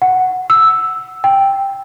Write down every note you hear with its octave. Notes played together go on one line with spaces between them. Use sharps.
F#5
E6
G5